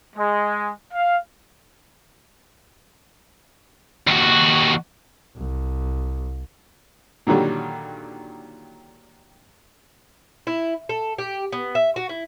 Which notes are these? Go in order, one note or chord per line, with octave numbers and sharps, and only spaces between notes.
G#3
F5
D#2 F#4
C2
A#2 D3 D#3 F#3 G3
E4
A4
G4
B3
E5
F#4
E4